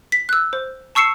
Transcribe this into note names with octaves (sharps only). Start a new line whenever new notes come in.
B6
E6 F#6
C5
A5 C#6 E6 C7 C#7 E7